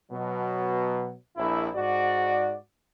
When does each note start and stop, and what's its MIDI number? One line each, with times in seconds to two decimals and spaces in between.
0.11 1.13 47
0.11 1.13 54
1.36 1.69 34
1.36 1.69 64
1.74 2.55 44
1.74 2.55 66
1.74 2.55 74